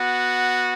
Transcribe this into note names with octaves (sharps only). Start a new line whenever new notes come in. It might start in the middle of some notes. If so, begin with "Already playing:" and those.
Already playing: B3 F#4